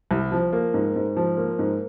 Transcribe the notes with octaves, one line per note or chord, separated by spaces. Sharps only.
C2
F3
A#3
G#2
G#2
F3
A#3
G#2